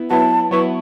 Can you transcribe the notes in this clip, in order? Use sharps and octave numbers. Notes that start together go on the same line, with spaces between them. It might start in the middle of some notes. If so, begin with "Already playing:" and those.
Already playing: B3 E4
F#3 B3 E4 A5
F#3 B3 E4 C#6